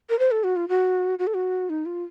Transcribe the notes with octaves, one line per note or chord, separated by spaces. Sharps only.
A#4
C5
A4
F#4
F4
F#4
F#4
A4
F#4
D#4
F4